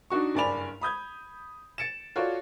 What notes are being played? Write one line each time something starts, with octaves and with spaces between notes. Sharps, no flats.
D4 D#4 F#4 C#6
F#1 G2 D5 G#5 B5 F7
B5 D#6 G6 G#6
A6 C#7 D7 E7
F4 F#4 A4 C#5 D5